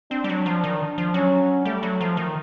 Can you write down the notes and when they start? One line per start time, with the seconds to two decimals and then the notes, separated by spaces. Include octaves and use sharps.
0.11 C4 D4
0.24 G3
0.29 F#3
0.46 F3
0.64 D#3
0.98 F3
1.14 F#3 C#4
1.65 G3 A3
1.83 F#3
2.01 F3
2.17 D#3